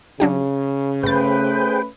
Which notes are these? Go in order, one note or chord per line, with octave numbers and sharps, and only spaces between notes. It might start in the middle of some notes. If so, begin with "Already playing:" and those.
C#3 F#3 D4 G4
G1 A3 C#4 G#4 B4 C5 G5 A6